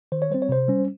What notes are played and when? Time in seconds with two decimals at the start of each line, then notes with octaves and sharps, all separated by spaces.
0.12 D#3 C5
0.22 C#5
0.30 G3 C4 C5
0.42 C#5
0.49 C3 C5
0.68 G3 C#4